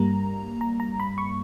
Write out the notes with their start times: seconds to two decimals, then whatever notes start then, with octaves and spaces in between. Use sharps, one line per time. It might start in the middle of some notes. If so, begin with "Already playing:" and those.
Already playing: G2 G3 A#3 A#5
0.61 A#5
0.80 A#5
1.00 B5
1.18 C#6